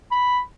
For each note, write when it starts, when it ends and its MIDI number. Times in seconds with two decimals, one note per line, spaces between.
0.12 0.38 83